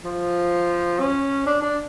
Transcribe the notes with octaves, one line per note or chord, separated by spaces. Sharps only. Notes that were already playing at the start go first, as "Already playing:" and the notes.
F3
C#4
D4
D4